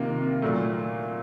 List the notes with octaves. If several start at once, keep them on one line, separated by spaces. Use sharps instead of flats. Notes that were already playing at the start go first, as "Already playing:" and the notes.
Already playing: C3 D#3 A#3 F4
A#2 F#3 A3